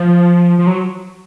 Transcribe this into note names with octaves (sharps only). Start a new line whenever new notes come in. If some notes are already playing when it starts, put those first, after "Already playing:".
Already playing: F3
F3
F#3